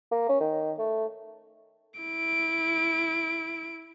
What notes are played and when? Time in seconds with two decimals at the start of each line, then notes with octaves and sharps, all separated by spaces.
0.11 A#3
0.29 C#4
0.41 D#3
0.78 A3
2.00 E4 D7